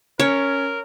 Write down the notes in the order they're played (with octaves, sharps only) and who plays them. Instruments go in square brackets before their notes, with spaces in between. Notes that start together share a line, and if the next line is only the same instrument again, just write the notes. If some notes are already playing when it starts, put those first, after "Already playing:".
[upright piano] C#4 [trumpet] A#4 [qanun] C#5